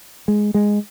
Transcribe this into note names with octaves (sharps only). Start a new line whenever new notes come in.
G#3
G#3